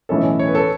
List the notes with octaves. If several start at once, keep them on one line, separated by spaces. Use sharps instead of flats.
B1 A2 E3 C#4 A4
C#5
B4
A4